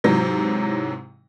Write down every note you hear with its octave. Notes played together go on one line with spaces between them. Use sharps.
G#2 C3 E3 F#3